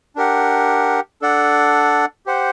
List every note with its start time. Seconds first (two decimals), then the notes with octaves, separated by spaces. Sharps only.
0.16 D4 G4 A#4 F#5
1.22 D4 A4 D5 F#5
2.26 G4 C5 F#5